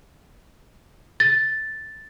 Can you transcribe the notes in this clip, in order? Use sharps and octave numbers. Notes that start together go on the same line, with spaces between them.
A6